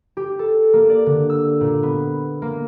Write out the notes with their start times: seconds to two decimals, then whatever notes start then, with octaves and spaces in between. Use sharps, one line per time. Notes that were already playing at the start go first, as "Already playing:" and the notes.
0.17 G4
0.39 A4
0.73 A#3
0.89 D5
1.06 D3
1.30 E6
1.61 A#2
1.83 B3
2.42 A#3